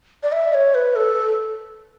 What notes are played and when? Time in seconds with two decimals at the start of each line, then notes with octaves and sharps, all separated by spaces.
0.23 D5
0.32 E5
0.53 C#5
0.75 B4
0.96 A4